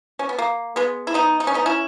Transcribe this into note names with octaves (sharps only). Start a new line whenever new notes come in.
C#4
B3
A#3
G#3 B3
E4
B3 D#4
D#4
C#4
B3 D#4
C#4 E4